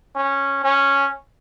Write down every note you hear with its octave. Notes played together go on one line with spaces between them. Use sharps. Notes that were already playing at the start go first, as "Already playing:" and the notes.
C#4
C#4